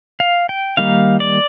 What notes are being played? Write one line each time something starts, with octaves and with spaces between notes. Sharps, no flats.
F5
G5
D#3 G3 A#3 D#4 F5
D5